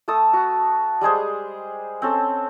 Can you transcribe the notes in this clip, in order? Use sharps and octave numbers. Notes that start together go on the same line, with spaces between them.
A3 A4 A5 D#6
F#4
G3 G#3 G#4 C5
C4 C#4 A4